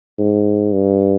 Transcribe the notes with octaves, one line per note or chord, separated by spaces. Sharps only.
G#2
G2